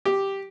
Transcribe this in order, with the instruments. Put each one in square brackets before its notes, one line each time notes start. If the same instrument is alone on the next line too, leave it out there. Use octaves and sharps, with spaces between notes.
[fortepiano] G4